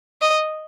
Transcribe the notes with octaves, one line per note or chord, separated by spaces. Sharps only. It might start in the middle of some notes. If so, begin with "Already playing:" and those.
D#5